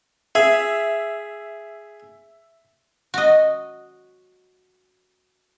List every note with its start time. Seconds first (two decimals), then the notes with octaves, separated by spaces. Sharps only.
0.35 G#4 E5
3.14 F#4 D#5